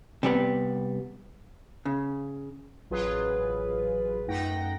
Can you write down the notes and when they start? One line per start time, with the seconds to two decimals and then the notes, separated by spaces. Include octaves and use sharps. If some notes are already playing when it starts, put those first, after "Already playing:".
0.23 C3 G3 B3
1.85 C#3
2.90 A1 F#3 F4 G#4 B4
4.28 F#2 A3 D#4 F#5 G5 A#6